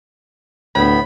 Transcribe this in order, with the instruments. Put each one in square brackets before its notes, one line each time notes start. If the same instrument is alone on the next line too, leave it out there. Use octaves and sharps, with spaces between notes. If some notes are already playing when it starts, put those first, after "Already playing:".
[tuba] D2 [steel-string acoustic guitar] A2 B3 [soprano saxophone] B5